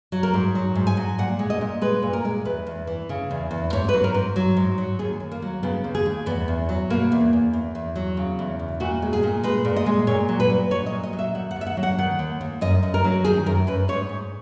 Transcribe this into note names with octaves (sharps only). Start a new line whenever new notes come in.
F#3
A#4
G#2
F#3
G#2
G#5
F#3
A#2 F#5
G#3
D#5
A#2
G#3 B4
A#2
A#4
G#3
E2 B4
E2
E3
C#3
E2
E2
G#2 C#5
B4
F#3
A#4
G#2
F#3
G#2
F#3
D#2 G#4
D#2
A#3
F#3
C#3 B3
D#2
G#4
D#2
E2 B3
E2
F#3
B2 A#3
E2
E2
E2
E2
F#3
C#3
E2
E2
A#2 F#4
G#3
G#4
A#2
G#3 B4
A#2
D#5
G#3
A#2 C#5
F#3
B4
A#2
F#3 C#5
D#5
A#2
D#5
F#3
E5
D#2 F#5
F#5
D#2
E5
F#5
F#3
F#5
D#3 F#5
D#2
D#2
F#2 D#5
F#2
A#4
F#3
D#3 G#4
F#2 A#4
F#2 B4
G#2 C#5
G#2